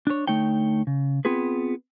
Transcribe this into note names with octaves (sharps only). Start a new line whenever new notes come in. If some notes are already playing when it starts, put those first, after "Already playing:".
D4 C#5
D2 A3 D#4 C#5 G5
C#3
B3 C4 F4 G#4 B4